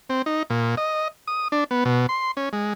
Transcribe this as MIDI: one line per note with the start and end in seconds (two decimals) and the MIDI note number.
0.10 0.22 60
0.26 0.43 63
0.50 0.75 46
0.77 1.08 75
1.28 1.48 87
1.52 1.64 62
1.71 1.84 59
1.85 2.07 47
2.09 2.31 84
2.37 2.49 61
2.53 2.73 56